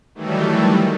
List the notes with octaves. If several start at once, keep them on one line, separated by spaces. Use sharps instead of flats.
D#3 E3 F#3 G3 A3